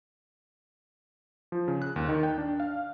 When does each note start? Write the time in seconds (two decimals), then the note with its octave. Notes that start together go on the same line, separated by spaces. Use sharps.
1.52 F3
1.68 C#3
1.82 F#6
1.96 D#2
2.09 D#3
2.23 G5
2.38 D4
2.60 F5